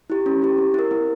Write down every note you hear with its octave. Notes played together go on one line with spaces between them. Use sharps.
E4 G4
C#4
E4 G4
C4
E4 A#4
C4